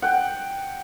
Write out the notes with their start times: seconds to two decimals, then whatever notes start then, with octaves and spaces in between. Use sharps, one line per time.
0.02 F#5 G5